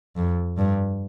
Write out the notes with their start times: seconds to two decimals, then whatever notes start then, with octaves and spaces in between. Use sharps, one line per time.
0.16 F2
0.57 G2